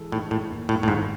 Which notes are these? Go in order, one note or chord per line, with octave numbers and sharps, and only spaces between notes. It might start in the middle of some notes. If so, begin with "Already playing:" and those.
Already playing: E3 G#3 A4
A2 D#4
A2
D#2
A2
A2
G#2 D#3